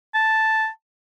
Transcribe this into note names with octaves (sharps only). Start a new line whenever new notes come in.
A5